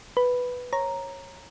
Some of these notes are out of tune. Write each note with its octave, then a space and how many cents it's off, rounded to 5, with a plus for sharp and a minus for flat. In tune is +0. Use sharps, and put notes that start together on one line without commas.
B4 +0 B5 +0
C#5 -20 A#5 +0